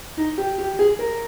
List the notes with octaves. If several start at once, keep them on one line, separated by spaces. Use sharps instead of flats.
D#4
G4
G4
G#4
A#4